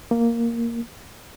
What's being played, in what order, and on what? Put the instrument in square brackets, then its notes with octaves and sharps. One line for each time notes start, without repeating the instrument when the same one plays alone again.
[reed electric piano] A#3